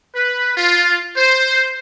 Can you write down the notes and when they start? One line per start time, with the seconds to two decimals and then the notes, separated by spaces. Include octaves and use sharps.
0.16 B4
0.57 F4
1.17 C5